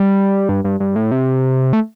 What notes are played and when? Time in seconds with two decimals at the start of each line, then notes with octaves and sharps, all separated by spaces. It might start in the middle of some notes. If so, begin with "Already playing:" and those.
Already playing: G3
0.49 G2
0.64 G2
0.80 G2
0.96 A2
1.12 C3
1.73 A3